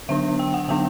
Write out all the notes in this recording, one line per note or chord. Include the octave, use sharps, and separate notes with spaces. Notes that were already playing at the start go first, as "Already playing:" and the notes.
D3 F#3 B3 D4 E5
G5
F#5
D3 F#3 B3 D4 G5